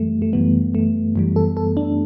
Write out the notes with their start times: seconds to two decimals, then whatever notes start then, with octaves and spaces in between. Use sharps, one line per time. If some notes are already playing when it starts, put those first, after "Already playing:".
Already playing: F#2 E3 G3 A3
0.22 A3
0.33 F#2 E3 G3 B3
0.75 A3
1.16 F#2 E3 G3
1.36 A4
1.57 A4
1.77 D4